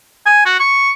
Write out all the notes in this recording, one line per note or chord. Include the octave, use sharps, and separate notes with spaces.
G#5
F#4
C#6